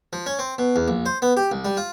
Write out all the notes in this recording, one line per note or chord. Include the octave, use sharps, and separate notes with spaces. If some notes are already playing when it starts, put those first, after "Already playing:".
F3
C#4
C4
B2
E2
A#1
C5
B3
G4
C2
G3
F4